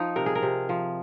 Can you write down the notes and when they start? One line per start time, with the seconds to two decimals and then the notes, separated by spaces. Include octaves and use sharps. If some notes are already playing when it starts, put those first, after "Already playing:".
Already playing: F3 D#4
0.16 C3 A#4
0.26 G#4
0.35 A#4
0.42 C3
0.69 F3